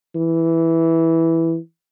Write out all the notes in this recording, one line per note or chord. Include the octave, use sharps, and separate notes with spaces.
E3